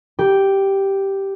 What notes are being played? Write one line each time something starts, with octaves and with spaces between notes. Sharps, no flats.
G4